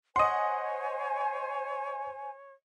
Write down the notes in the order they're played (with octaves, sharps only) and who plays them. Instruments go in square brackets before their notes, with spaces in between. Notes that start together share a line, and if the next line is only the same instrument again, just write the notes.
[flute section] C5 G#5 [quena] C#5 [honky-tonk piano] D#5 F#5 [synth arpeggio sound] C6 D#6